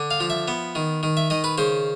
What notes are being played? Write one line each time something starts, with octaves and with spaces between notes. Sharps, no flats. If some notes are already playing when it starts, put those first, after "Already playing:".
Already playing: D3
F5
F3
E5
B3
D#3
D#3
E5
D#3 D#5
B4
C#3 C5